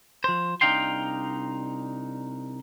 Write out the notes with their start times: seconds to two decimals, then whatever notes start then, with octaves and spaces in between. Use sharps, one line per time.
0.24 F3 C5
0.61 C2 D4 D#4 F5 G5 C6